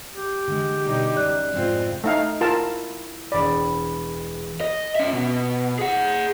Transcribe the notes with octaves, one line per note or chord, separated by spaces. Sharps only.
G4
D3 G#3
B2 G3 D#4
F#2 D5 F#6
F2 G#2 C3 G#3 C4 F4
A3 D#4 F5
E4 F4 A#4 A5
E1 D5 B5
D#5
C#4 E5
B2
G#4 F#5